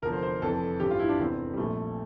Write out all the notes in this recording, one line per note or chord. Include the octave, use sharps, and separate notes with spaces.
F1 E2 D3 F3 A#4
C5
C5
F1 F2 E3 A4
A1 G2 E3 G4
F4
E4
D4
F1 E2 E3 C4
G3
A#1 A#2 F3 A3